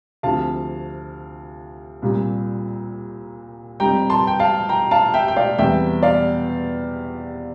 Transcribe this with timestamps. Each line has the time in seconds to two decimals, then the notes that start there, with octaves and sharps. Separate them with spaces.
0.23 D2 C3 F3 F5 A5
2.02 C2 A#2 G3
3.80 F2 C3 G3 G5 A#5
4.10 A5 C6
4.27 G5
4.39 F5 A5
4.69 G5 A#5
4.91 F5 A5
5.14 E5 G5
5.28 G5
5.36 D5 F5
5.58 E2 C3 G3 E5 G5
6.03 D5 F5